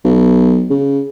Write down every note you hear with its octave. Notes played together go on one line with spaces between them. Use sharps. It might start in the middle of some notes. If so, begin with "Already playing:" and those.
B1
C#3